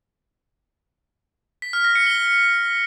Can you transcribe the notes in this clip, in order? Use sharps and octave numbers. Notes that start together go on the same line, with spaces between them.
B6
F6
A#6
C#7
G7